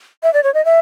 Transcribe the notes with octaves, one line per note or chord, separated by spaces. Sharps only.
E5
D5
C#5
D#5
E5